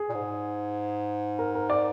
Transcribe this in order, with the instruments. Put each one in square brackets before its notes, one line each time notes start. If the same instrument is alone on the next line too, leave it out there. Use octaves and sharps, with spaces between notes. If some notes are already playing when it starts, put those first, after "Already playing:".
Already playing: [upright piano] G#4
[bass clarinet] A#2
G#2
[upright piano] A#4
A#4
D5